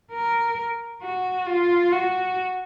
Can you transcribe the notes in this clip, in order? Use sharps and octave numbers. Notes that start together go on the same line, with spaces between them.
A#4
F#4
F4
F#4